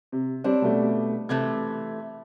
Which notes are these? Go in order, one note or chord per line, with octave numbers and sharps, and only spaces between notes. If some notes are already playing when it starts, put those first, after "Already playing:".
C3
G3 C4 D4 C#5
B2 G3 A3
C3 E3 A3 G#6